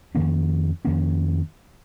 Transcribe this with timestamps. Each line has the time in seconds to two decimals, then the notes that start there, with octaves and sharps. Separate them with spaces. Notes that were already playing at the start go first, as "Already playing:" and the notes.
0.15 F2 D#3 A#3 C#4
0.85 F2 D#3 A#3 C#4